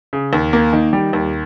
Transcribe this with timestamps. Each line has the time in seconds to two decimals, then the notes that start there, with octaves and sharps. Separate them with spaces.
0.13 C#3
0.33 D#2
0.53 A#3
0.73 D#3
0.93 G3
1.13 D#2